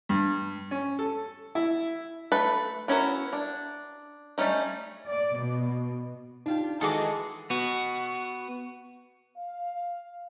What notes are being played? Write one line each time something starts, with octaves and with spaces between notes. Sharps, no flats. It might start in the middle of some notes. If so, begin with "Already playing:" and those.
G2
C#4
A4
E4
A3 A4 B4
B3 C#4 E4 F#4 A#4
D4
G3 A3 C#4 D#4
D5
B2
D4 D#4 F4 G4
D#3 E3 G#3 F#4 G#4 A4 D6
B3 F#4
F5